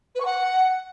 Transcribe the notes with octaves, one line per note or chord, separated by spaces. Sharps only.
B4
C#6
F#5